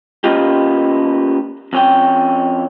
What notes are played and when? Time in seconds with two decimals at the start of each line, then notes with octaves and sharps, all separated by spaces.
0.24 A#3 B3 C#4 D#4 F4 G4
1.73 F2 C#4 G5